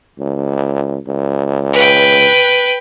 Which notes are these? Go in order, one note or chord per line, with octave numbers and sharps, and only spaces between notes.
C#2
C#2
B4 G5